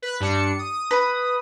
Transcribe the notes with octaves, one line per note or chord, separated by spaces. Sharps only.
B4 F#6
G2 D4 C#7
D#6
B4